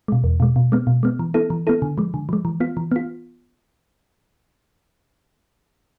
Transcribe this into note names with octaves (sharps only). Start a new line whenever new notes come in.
B2 G#3
E2
B2 G#3
B2
G#3 B3
B2
G#3 B3
E3
B3 E4 A4
E3
B3 E4 A4
D3
F3 G#3
D3
F3 G#3
E3
B3 F4
E3
B3 F4